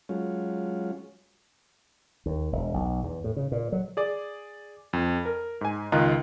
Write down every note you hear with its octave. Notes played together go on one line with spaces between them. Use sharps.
F#3 G#3 C#4 F4
D#2
E1
B1
E2
A2
C#3
A#2
F#3
G#4 D5
F2
A#4
G#2 G#5
C#2 D#3 F4 D#5 A#5 F#6